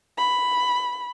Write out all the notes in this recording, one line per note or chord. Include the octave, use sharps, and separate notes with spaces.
B5